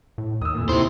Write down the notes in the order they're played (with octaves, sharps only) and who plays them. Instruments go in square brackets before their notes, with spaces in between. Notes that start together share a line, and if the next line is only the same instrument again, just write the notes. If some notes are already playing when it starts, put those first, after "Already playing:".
[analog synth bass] A2
[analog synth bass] D#2 [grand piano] D#6 E6
[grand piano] F1 A#2
[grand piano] D#2 [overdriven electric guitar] C3 C5 [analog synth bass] E4